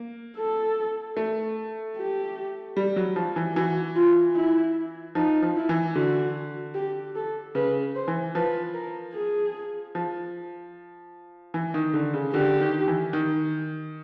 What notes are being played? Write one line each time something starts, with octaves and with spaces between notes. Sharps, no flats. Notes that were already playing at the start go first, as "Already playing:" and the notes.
Already playing: A#3
A4
A3
G4
G3
F#3
F3
E3
E3 F#4
F4
E4
F3 D#4
F3
E4
E3
D3 F#4
G4
A4
C#3 B4
C5
E3
F3 B4
A#4
G#4
F3
E3
D#3
D3
C#3
D3 G4
D#3
E3
D#3